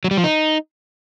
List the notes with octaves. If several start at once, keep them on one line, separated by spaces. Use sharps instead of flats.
F#3
G3
F3
D#4